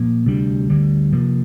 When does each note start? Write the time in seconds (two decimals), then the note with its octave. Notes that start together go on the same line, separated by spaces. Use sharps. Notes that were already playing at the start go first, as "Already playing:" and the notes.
Already playing: A#2 F3 A#3
0.26 D2 C3 G3 D4
0.70 D2 D3 G3
1.13 C3 F3 A#3